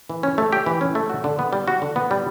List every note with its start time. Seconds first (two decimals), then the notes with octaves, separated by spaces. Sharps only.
0.10 E3
0.23 C#4
0.38 A3
0.52 G4
0.66 E3
0.81 C#4
0.95 A3
1.09 F#4
1.24 D3
1.39 B3
1.53 G3
1.68 F#4
1.82 D3
1.96 B3
2.11 G3